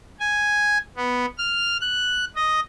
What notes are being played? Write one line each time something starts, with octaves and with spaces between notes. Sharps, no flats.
G#5
B3
F6
F#6
D#5